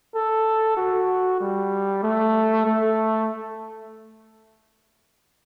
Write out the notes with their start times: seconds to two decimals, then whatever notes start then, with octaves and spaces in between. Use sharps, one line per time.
0.14 A4
0.77 F#4
1.41 G3
2.03 A3
2.66 A3